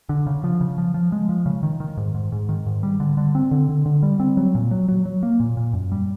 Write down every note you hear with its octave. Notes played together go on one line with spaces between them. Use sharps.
D3
C#3
F3
C#3
F3
F3
G#3
F3
C#3
D#3
D#3
G#2
G#2
G#2
D#3
G#2
G3
D3
D3
C4
D3
D3
D3
G3
C4
F#3
A#2
F#3
F#3
F#3
A#3
A#2
A#2
F#2
G3